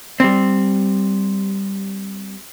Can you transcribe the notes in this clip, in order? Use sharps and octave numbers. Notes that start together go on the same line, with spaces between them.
G3 C4